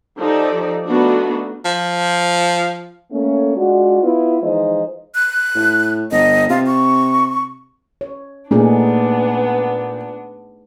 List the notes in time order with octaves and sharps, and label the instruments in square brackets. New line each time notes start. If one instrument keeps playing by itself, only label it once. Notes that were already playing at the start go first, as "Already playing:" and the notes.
[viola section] F3 D#4 G4 A4 D5
A3 B3 D4 D#4 F4 F#4
[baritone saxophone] F3
[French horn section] A3 A#3 C#4
G#3 D4 F4 F#4
B3 E4 F4
E3 F3 G#3 D#4 C5 D#5
[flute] F#6
[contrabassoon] A2
[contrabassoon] G1 [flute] D#5
[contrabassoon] C3 [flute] F4
[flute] C#6
[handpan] C#5
[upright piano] A#2 [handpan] A3 D#4 G#4 [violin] B3 D4